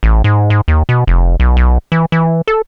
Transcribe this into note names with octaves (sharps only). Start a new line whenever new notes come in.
A1
G#2
G#2
D#2
B2
F1
B1
B1
E3
E3
A4